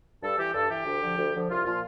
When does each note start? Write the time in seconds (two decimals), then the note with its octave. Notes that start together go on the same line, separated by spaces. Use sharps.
0.22 G2 A4
0.38 E3 G4
0.54 G2 A4
0.70 E3 G4
0.86 D2
1.02 D3 F3
1.18 D2
1.34 D3 F3
1.49 C2 F4
1.65 A#2 F3 F4